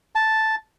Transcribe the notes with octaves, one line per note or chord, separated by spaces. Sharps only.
A5